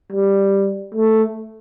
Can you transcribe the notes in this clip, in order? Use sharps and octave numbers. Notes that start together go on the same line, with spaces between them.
G3
A3